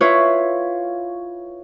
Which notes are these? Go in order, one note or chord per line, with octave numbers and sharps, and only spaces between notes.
E4 F4 B4 C#5